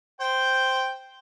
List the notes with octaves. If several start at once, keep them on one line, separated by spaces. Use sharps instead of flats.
C5 G5